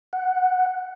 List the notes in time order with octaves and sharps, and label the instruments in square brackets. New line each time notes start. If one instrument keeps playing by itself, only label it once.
[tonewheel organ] F#5